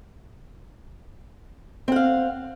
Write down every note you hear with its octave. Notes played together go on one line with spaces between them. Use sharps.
C4 F5 F#5